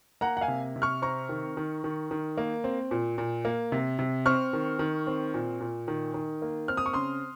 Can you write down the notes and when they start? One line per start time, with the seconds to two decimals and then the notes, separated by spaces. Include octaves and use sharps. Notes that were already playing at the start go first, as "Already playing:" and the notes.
0.21 A#3 F#5 A#5
0.37 F#5
0.41 F5 G#5
0.48 C3
0.76 C3
0.82 C#6 F6
1.02 C4 A#5 C#6
1.29 D#3
1.57 D#3
1.84 D#3
2.11 D#3
2.37 A#3
2.64 C4
2.91 A#2
3.18 A#2
3.45 A#3
3.72 C3
3.99 C3
4.26 C4 C#6 F6
4.53 D#3
4.79 D#3
5.07 C4
5.34 A#2
5.60 A#2
5.88 D#3
6.14 D#3
6.42 A#3
6.68 C4 F6
6.77 D#6
6.86 C#6
6.93 C#3 C6 D#6